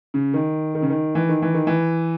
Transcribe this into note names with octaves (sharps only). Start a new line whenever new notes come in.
C#3
D#3
D#3
C#3
D#3
E3
D#3
E3
D#3
E3